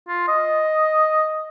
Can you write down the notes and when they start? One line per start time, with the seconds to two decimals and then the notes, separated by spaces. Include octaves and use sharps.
0.08 F4
0.28 D#5